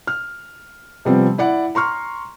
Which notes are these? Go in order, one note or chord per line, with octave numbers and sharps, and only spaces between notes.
F6
C3 F3 G3 B3 C4
E4 D5 F#5
A#5 C6 C#6 F6